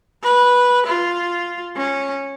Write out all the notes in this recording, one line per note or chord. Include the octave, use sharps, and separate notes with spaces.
B4
F4
C#4